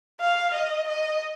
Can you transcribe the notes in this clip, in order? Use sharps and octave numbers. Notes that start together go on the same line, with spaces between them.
F5
D#5
D#5